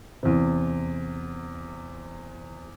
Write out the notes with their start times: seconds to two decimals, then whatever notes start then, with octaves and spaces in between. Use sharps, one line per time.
0.23 E2 C3